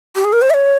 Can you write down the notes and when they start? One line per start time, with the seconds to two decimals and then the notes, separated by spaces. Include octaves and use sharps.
0.16 G4
0.25 G#4
0.33 A#4
0.42 C5
0.50 E5
0.54 C#5